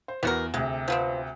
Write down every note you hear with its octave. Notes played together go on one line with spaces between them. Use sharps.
C5
E2 B3 F#4 A#4
D2 C3 G#3
F3 B3 C4